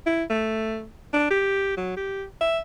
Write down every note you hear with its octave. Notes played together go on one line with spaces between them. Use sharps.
E4
A3
D4
G4
F#3
G4
E5